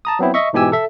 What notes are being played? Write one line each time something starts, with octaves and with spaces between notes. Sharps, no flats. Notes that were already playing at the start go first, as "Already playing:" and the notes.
A5 A#5 D#6
F#3 B3 C4 E4
D#5 E5 C#6
G#2 B2 E3 G4 G#5 E6
A4 E5